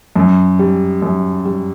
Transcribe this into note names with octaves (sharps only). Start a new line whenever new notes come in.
F#2
G3
F#2
G3